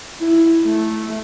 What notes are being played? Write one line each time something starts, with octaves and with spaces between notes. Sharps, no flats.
E4
A3